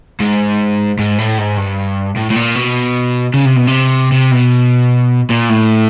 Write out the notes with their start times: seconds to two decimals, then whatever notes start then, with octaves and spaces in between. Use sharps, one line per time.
0.20 G#2
0.99 G#2
1.18 A2
1.38 G#2
1.57 G2
2.17 A2
2.31 A2
2.36 A#2
2.56 B2
3.34 C#3
3.45 C3
3.56 B2
3.67 C3
4.12 C3
4.32 B2
5.30 A#2
5.49 A2